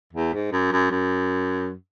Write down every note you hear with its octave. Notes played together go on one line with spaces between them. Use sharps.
E2
G#2
F#2
F#2
F#2